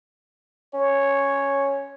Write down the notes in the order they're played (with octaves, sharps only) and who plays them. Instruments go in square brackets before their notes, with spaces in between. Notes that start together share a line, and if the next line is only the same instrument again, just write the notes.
[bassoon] C#4 [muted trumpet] C#5